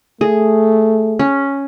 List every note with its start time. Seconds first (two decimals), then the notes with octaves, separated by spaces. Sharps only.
0.21 A3 G#4
1.19 C#4